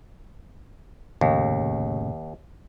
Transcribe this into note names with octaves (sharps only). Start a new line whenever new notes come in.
F1 D#2 A2 C#3